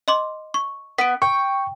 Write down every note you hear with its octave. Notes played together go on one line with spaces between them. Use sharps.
D#5 C6 D6
C#6
B3 B6 D7
G5 C#6